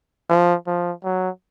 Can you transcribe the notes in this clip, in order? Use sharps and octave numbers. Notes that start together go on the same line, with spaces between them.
F3
F3
F#3